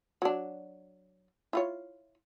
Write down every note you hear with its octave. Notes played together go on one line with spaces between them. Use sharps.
F#3 D4
E4 F4 C#5